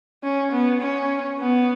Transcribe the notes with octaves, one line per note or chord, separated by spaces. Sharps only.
C#4
B3
C#4
B3